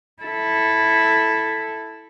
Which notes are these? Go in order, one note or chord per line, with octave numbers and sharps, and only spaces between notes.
E4 A4